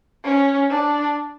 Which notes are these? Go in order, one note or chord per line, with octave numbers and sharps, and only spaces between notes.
C#4
D4